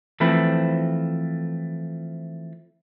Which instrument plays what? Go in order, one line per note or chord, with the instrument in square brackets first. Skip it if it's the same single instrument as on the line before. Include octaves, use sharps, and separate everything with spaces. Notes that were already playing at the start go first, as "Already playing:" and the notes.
[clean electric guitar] E3 F3 A3 C4 B4